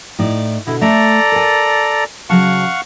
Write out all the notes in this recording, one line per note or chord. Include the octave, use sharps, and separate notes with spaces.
A2 D#4 D5
B2 D3 E4
A3 A4 D5 E5 A#5
A#4 G#5
C#3 F#3 F5 F#5 A5 C#6